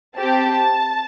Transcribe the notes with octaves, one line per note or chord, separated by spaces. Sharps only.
C4 G4 A5